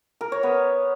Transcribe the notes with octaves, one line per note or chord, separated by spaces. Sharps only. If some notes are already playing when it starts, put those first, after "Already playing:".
A#4
C#5
B3